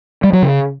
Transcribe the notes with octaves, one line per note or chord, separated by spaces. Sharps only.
G3
F#3
C#3